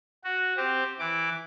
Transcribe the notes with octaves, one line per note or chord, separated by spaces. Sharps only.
F#4
C4 G4
E3 D6